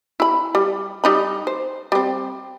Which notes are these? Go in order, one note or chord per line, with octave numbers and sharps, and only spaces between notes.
E4 B5
G3
G3 D#4 B5
C5
G3 C4